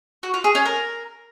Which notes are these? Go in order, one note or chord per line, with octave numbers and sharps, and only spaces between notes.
F#4
F4
G#4
C#4
A#4